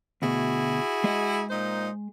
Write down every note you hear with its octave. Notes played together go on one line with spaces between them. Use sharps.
D2 B2 E4 F#4 G#4
G#3 D#5
A#2 D#4 C5